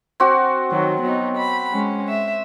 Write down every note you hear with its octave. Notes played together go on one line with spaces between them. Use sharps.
C4 F#4
D#3 F#3
F#3 B3 D#4
B5
G#3 C#4
E5